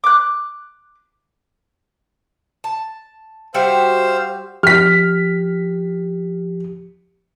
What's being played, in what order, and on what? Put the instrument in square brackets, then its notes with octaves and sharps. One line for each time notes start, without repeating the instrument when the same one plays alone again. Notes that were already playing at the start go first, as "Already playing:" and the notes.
[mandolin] D6 F#6
[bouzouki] A5
[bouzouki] G3 F#4 E5 [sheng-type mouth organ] C5 F5 E6
[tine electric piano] F3 G4 [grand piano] F6 B6